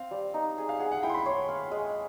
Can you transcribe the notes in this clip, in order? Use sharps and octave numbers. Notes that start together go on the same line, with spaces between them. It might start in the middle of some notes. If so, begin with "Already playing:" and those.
Already playing: C4 F5
G3
D#4
G#4
F5
G#4 F#5
F#5
E4 G5
C6
B5
C#5 C6
F5
G#3